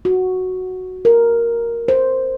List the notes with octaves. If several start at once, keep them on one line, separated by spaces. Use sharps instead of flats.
F#4
A#4
C5